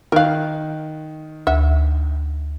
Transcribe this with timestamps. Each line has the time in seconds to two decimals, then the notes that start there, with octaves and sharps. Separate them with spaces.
0.12 D#3 A#4 F5 F#6
1.47 D2 E5